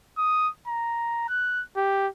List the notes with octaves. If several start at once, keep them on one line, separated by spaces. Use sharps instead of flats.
D#6
A#5
F#6
G4